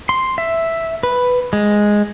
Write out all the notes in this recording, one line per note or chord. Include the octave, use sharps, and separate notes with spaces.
C6
E5
B4
G#3